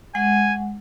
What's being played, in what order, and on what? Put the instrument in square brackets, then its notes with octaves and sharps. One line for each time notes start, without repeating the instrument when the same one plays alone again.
[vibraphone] G#3 F#5 [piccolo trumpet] G#5